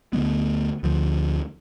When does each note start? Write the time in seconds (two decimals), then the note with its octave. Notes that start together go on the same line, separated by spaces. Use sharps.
0.13 D2 D3 G#3 B3
0.83 D2 D3 F3